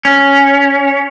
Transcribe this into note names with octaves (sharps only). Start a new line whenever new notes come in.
C#4